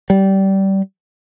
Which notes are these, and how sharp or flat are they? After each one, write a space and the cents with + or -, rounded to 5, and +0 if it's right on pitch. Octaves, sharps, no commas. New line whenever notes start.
G3 -20